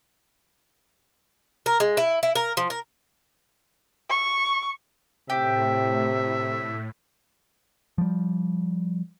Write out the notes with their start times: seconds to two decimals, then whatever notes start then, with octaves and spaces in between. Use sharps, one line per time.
1.66 A#4
1.80 G#3
1.97 E4
2.23 E4
2.35 A#4
2.57 F3
2.70 A#4
4.10 C#6
5.30 A2 C3 G4 E5
7.98 F3 G3